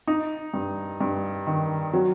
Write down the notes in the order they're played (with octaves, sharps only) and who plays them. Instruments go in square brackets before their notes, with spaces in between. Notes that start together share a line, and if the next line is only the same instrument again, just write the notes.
[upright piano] D#4
G2
G2
D#3
F#3